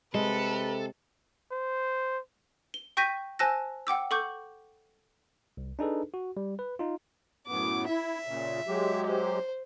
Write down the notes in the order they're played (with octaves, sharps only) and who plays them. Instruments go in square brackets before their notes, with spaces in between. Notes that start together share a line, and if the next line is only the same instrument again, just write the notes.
[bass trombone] C3 [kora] G#3 [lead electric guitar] A4 [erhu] B4
[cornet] C5
[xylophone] G7
G5 C#6 G6 A#6 B6 D#7
C5 G#5 A5 E6 F#6 A#6
F#5 G5 D6 E6
A4 F#5 C#6 D6 G6
[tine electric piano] C2
D4 D#4 G#4 A4 B4
F#4
G3
B4
D#4 F4
[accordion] F#2 A2 B3 [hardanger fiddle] D6
[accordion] E4 [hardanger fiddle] E5
[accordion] A#2 C#3
F#3 G#3 G4
[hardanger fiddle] C5